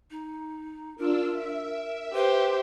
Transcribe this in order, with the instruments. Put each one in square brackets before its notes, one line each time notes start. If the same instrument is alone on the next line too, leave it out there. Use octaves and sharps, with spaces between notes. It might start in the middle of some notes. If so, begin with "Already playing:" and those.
[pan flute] D#4
[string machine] D4 F4 E6 [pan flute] A#4
[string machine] E5
[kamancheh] G4 C5 [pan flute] B4